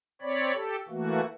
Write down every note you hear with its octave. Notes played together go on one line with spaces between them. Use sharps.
C4 C#5 D5 B5
G4 A4
E3 A3 A#3 F#4